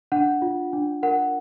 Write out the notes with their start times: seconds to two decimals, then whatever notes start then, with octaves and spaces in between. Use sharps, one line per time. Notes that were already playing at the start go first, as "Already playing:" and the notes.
0.12 D4 F#5
0.42 F4
0.73 D4
1.03 A#4 F#5